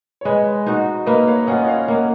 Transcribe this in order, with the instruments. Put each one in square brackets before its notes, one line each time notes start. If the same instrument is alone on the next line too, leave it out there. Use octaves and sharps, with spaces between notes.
[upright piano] C#5
[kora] G#3 [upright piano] B4 D#5
[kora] D#4 F#4
[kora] A#3 [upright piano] B4 D#5
[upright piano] C#5 F5
[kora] C#4 F4 [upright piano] D#5 F#5
[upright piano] D#5
C#5 F5
[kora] A#3 [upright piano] D#5 F#5